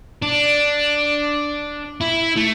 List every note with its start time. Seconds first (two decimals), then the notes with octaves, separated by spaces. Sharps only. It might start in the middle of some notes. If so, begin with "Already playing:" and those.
0.22 D4
2.01 E4
2.37 A3